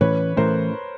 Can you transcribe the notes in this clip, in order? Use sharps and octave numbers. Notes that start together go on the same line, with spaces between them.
A2 E3 A3 C#4 B4 C#5
A2 E3 A3 C#4 A#4 C5